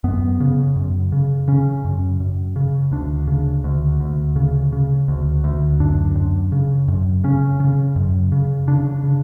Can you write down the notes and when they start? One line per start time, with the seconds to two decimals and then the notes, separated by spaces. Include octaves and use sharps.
0.04 F#2 B3
0.40 C#3
0.76 F#2
1.12 C#3
1.48 C#3 C#4
1.84 F#2
2.20 F#2
2.56 C#3
2.92 D2 D4
3.27 C#3
3.64 D2
4.00 D2
4.36 C#3
4.73 C#3
5.08 D2
5.44 D2
5.80 F#2 D4
6.16 F#2
6.52 C#3
6.88 F#2
7.24 C#3 C#4
7.60 C#3
7.96 F#2
8.32 C#3
8.67 C#3 D4
9.04 C#3